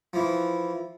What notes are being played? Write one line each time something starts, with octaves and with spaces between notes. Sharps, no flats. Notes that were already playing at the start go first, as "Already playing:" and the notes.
E3 F3